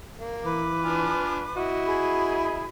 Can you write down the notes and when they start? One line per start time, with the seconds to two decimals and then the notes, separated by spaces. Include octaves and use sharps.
0.18 A#3
0.44 E3 B4 D6
0.83 D4 F4 G#5
1.56 E4 F#4 D#5
1.85 G#4 B5